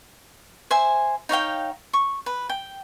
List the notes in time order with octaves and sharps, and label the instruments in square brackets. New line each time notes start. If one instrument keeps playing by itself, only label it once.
[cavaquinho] C5 E5 G#5
D#4 C#5 F5 G5
C#6
B4
G5